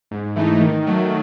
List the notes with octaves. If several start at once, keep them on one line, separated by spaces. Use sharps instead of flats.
G#2
E3 A3 D#4
D#3
F#3 A3